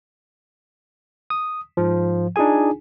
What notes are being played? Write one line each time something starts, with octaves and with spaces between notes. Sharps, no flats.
D#6
G#2 F3
D4 D#4 F4 G#4 G#5